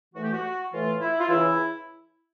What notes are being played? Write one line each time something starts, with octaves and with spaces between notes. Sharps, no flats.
A2 E3 A3 F#4
G4
F#4
A2 E3 A3 F4
E4
F4
C#3 E3 E4